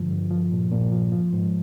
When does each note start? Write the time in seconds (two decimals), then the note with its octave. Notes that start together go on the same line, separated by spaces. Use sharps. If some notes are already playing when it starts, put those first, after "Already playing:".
Already playing: G2 D3 F3
0.10 G2
0.31 F3
0.52 A#2
0.72 A#2
0.92 F3
1.12 F3
1.33 G#2